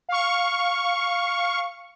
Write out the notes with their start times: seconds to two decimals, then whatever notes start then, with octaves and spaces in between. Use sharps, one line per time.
0.09 F5 C#6